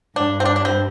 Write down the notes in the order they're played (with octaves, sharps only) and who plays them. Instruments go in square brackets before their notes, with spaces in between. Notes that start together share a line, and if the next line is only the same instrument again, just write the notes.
[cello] G2 [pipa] D4
[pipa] C4
D4
D4
C4